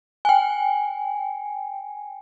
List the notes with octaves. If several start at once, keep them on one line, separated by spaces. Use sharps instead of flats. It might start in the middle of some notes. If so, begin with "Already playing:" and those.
G5 G#5